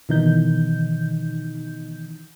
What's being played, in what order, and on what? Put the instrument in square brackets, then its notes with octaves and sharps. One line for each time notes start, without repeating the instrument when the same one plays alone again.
[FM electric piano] B2 D#3 E3 D#4 G6